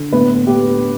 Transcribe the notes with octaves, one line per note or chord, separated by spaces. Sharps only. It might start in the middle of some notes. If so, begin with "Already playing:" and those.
Already playing: D3
A2 B3 B4
A2 G4